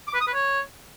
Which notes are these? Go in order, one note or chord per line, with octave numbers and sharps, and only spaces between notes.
D6
B4
D#6
B4
C#5